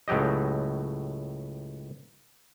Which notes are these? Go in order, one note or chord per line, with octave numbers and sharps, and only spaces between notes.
C#2 A2 F#3 G4 D#5